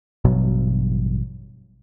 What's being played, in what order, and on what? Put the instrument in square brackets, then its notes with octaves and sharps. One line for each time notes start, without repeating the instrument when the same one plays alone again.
[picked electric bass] A1 G2 B2 F#3